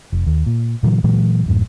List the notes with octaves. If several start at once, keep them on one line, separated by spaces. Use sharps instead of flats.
F1
D#2
A#2
A#2 D3 E3 F#3
A#2 E3 F#3 G#3
D1 F#2 A2